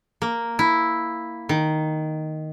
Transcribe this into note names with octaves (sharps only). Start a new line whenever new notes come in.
A#3
E4
D#3